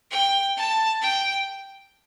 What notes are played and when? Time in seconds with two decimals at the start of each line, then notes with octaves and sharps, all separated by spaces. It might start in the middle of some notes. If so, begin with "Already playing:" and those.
0.11 G5
0.57 A5
1.02 G5